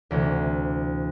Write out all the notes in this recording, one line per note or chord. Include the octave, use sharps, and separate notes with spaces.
D2 C3 E3 A3